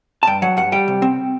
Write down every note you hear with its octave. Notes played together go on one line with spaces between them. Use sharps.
A5
G2 G5
F#3 F#5
G2 F#5
G3 G5
C3
C4